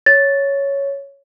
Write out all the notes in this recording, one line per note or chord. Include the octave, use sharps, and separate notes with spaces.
C#5 A6